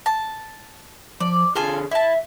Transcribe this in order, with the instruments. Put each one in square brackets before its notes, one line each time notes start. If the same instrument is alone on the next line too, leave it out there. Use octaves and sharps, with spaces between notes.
[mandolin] A5
[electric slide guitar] F3 [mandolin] D5
[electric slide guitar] D3 G#4 [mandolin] F4 A4 G#5
[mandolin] E4 A5 [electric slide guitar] E5